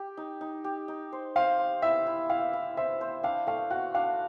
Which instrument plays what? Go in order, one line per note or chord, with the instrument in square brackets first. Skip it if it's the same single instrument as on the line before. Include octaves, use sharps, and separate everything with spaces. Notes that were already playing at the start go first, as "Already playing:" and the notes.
Already playing: [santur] G4
D#4
D#4
G4
D#4
C5
[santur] C5 [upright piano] F5
[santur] C5
[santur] E4 [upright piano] E5
[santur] E4
[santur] E4 [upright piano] F5
[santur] E4
[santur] C5 [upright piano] E5
[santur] C5
[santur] D4 [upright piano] F5
[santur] A3 [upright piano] F5
[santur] F#4 [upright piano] F#5
[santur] D4 [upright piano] F5